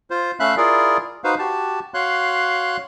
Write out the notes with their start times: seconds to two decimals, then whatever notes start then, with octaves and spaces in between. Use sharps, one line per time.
0.10 F4 C5
0.40 A3 C#4 E5 F5 B5 F#6
0.57 E4 F4 G#4 A#4 D5
1.24 D#4 F#4 B4 C5 F5
1.39 F#4 G4 A5
1.94 F#4 C#5 F5 C6 F#6